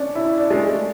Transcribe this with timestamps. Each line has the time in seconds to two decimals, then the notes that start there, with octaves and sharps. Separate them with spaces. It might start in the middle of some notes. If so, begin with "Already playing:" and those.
Already playing: C#4 D4
0.15 E4
0.38 D4
0.51 G#3
0.60 A3